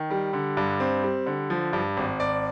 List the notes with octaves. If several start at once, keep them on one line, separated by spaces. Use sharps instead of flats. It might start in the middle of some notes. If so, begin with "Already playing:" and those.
Already playing: D#3
G3
D3
G2
C4
G3
D3
F3
G2
G#1
G#1 D5